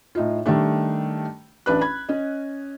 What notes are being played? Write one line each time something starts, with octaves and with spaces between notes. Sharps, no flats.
A2 D#4 F4
D#3 G3 A3 D4
A1 D4 B4 F#6
B5 G#6
C#4 D#5